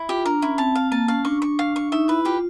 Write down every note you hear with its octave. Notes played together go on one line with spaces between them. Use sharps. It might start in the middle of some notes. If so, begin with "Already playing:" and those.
Already playing: E4
F4 G4
D4 A#4
C#4 E4
C4 A5
F5
A#3 A5
C#4 F5
D4 C#6
C#6
F5
C#6
D#4 E5
E4 B4
F4 G4